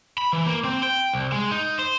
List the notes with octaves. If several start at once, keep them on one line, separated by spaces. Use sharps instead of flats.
B5
E3
A#3
C4
G5
C2
G#3
D#4
C5